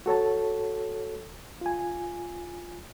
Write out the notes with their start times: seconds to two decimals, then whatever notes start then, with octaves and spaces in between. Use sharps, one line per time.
0.06 F#4 A4 C#5 A5
1.61 F4 G#5